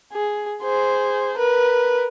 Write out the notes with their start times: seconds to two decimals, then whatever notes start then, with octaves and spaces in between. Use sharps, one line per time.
0.12 G#4
0.63 G#4 C5
1.37 A#4 B4